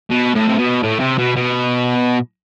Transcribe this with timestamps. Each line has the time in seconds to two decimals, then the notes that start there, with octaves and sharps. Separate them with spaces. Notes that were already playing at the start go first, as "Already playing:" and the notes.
0.10 B2
0.35 A2
0.48 C3
0.59 B2
0.83 A2
1.00 C3
1.18 B2
1.36 B2